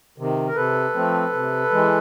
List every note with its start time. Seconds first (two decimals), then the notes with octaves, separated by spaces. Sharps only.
0.18 C3 D#3
0.48 A#4
0.56 C3 A4 B4
0.94 F3 A3 C4
1.33 C3
1.71 E3 G#3